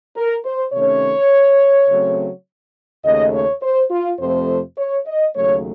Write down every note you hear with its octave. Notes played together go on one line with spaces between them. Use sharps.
A#4
C5
C3 D#3 A3 C#4 C#5
C#3 F#3 A3 C4
D#2 C#3 A3 D#5
C#5
C5
F4
F2 C3 F3 A3 C4 C5
C#5
D#5
D#2 C#3 F#3 A3 C#5